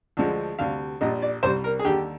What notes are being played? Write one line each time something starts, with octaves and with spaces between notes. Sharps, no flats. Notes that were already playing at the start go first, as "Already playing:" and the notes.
D2 D3 F3 G#3
D2 C3 G3 F5
A#1 A#2 G3 D#5
D5
C2 C3 G3 C5
A#4
G#4
D#2 D3 G3 G4